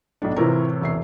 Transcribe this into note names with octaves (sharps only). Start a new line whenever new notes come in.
B1 A2 D4
A2 C3 E3 E4 F4 A#4
E1 E5 C7